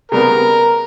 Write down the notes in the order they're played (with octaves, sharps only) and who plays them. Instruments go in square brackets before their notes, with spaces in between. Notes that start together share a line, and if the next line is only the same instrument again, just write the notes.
[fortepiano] C#3 G3 B3 [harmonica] A#4